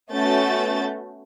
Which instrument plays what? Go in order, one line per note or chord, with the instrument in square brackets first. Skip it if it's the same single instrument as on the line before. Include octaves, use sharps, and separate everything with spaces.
[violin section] A3 B3 C#4 F#4 G6 A6